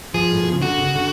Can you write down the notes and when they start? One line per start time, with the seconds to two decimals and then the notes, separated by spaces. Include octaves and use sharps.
0.14 F3 G#4
0.32 A2
0.43 B2
0.52 C#3
0.62 D3 F#4
0.78 C#3
0.95 D3